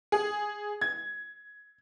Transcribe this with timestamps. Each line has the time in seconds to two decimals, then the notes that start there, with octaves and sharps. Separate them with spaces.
0.12 G#4
0.81 G#6